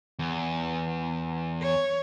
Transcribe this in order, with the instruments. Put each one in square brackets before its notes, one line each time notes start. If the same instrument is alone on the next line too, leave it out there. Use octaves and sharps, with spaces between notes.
[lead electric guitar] E2
[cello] C#5